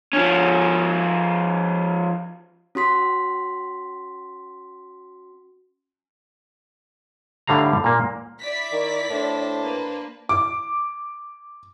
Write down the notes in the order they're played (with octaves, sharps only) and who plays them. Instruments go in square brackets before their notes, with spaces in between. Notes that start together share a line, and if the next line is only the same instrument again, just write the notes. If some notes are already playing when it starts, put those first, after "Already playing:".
[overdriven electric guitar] F3 C#4
[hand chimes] C#4 F#4 C6 B6
[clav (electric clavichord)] A2 D3 G3 F5 A#5
A#2 A#3
[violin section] E4 D5 B6
[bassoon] D#3
[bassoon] A2 [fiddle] D4 C5
[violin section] A#3 B4
[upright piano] D6